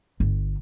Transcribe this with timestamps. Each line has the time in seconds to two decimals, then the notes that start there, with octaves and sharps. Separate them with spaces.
0.20 G1